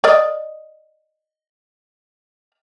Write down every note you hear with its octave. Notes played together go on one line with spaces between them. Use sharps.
A#4 D5 D#5